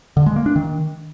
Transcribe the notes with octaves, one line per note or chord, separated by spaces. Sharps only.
D3
G#3
A#3
D4
D#3